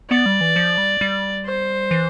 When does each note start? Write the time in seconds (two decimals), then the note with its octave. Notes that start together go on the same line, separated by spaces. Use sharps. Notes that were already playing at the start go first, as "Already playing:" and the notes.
0.10 B3 D5
0.26 G3
0.41 E3
0.56 F3
0.78 G3
1.01 G3
1.46 C5
1.91 E3